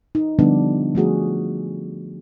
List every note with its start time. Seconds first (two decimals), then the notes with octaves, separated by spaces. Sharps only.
0.15 D#4
0.39 D3 F3 G3 B3 D4
0.95 F3 A3 F#4 G#4